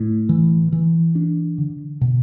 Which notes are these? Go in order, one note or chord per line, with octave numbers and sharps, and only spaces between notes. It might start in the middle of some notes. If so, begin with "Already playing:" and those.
Already playing: A2
E3
E3
D4
D3
B2